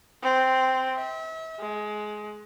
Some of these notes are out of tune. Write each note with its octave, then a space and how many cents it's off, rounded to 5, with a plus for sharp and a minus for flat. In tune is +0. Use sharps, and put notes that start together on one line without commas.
C4 -5
E5 -35
G#3 +20